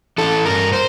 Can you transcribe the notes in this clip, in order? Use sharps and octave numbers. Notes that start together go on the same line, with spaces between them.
E3 A4
G2 A#4
C5